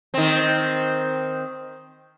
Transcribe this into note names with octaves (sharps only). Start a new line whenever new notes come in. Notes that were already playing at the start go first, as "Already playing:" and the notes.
D#3 C4